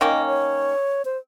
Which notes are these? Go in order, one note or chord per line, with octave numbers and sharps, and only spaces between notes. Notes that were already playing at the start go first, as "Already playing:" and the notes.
D#3 A#3 C#4 D#5
C#5
C5